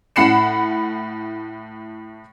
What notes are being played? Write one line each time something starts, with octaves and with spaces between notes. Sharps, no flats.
A2 F#5 B5 C7 C#7 E7